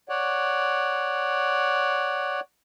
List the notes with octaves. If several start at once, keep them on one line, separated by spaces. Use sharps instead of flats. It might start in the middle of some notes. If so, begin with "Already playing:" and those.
C#5 D5 F#5